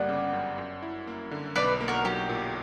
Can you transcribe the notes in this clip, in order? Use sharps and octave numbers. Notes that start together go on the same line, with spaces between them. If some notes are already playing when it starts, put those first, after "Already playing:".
Already playing: G1 G3 A#3 D5 F#5
C#3
F#2
F#2
E4
A#3
D3
B1 B4 D5
A#3
F#4 A#4
F#3 G4
A#2